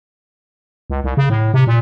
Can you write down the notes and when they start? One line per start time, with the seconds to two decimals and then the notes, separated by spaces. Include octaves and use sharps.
0.90 C#2
1.04 C2
1.17 C#3
1.30 A2
1.54 C3
1.67 A#2